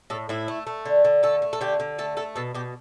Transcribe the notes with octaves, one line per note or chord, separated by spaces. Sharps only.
A2 A4
A2 E4
A3
A3
D3
D3
A3 A4
A3
A4
D3 G4
D3
A3 A4
A3 A4
B2 A4
B2 G4